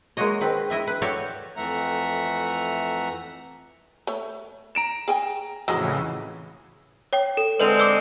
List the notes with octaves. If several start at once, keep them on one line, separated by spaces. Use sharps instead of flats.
G#3 A#3 F#4 C#5 D#5
D#3 C4 B4
E4 D#5 E5
B4
F#4 A4 C#5 D5 E5 G5
F2 E3 A3 E5 F#5 A#5
A3 C#5
A#5 D7 E7
G#4 G5 G#5
F2 A2 C#3 E3 F#3 G#3 D#5 E6
C#5 G5
A4
D3 G#3 C4 B4 D5 F7
D6 E6